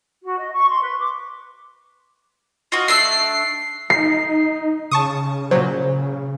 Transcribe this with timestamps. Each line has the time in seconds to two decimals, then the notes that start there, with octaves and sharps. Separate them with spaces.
0.22 F#4
0.38 D#5
0.52 C#6
0.68 C6
0.80 B4
0.99 D6
2.72 F4 F#4 D#5
2.88 A3 D4 E6 C7
3.90 D#4 C7
4.91 C#3 A5 C#6 D#6
5.51 A#2 F#3 C5